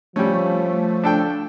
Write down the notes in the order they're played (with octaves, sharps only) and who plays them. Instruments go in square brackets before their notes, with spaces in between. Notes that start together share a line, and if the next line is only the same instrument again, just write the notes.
[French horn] F3 [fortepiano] G3 C#4 [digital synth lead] A3
[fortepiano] D4 A4 G5